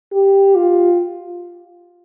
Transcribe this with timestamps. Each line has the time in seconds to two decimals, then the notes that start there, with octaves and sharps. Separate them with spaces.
0.13 G4
0.55 F4